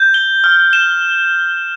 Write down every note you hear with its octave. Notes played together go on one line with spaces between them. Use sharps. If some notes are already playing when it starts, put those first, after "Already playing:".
Already playing: G6
G7
F6
E7